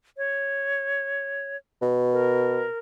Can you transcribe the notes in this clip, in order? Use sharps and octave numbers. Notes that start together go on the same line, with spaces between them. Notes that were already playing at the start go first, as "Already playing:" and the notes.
C#5
B2
A#4